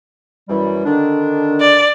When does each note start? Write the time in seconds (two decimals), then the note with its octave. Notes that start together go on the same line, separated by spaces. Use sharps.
0.49 F#2 E3 G3
0.85 D3 D#3 D4
1.61 D5